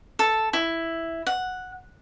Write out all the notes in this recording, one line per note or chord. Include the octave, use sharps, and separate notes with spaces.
A4
E4
F#5